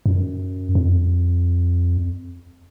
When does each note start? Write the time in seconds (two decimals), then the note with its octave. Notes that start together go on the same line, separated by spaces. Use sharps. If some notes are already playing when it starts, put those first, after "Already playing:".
0.06 F#2
0.75 F2